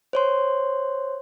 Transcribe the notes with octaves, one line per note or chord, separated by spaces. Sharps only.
C5 C#5 C6